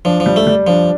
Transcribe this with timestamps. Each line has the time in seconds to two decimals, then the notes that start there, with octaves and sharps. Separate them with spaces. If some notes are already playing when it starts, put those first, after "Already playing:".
0.05 F3 D4
0.20 F3
0.26 G3
0.36 A3
0.47 G3
0.67 F3 D4